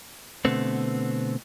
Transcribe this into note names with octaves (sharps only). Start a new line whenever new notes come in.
B2 D3 A3 B3 C4